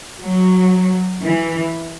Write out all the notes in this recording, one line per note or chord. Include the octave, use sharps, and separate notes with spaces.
F#3
E3